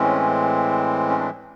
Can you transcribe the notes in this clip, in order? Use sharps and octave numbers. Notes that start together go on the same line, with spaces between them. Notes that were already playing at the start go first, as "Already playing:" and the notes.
Already playing: A2 E3 G#3 C4 C#4
C#4
D4